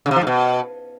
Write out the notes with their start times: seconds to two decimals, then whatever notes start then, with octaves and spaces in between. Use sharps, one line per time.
0.06 C#3
0.11 C3
0.16 F3
0.22 G#2
0.27 B2